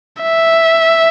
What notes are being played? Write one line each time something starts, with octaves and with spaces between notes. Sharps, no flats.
E5